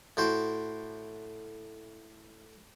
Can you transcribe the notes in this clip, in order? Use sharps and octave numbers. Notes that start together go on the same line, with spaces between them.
A2 F#4 C5 G5